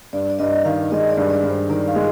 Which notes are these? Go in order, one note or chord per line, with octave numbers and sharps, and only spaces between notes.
G2 D5
D5
G2 D#5
D#3 F5
G#3 D#5
D5
G2
D5
G2
C5
D#3 D5
F5
G#3 D#5